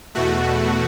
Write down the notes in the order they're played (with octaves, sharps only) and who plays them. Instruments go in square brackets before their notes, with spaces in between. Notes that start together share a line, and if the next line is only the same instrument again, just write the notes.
[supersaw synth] E2 B2 A3 F#4